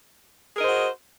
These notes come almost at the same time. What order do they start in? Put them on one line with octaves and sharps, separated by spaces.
G#4 A#4 D#5 C5 F#4